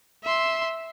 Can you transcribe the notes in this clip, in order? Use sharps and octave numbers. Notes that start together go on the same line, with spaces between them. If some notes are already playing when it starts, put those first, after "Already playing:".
E5 C6